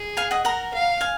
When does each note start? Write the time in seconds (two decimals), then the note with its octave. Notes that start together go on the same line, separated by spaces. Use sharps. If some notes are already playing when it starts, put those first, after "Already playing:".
Already playing: G#4
0.17 F5 G#5
0.31 D#5 F#5
0.45 A#4 F#5 A#5
0.73 F5
1.01 F5 G#5